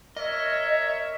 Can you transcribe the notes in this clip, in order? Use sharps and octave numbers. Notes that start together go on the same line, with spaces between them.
A#4 C#5 D#5 E5